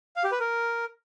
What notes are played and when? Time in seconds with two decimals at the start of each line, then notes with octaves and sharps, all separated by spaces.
0.16 F5
0.24 G4
0.32 B4
0.40 A#4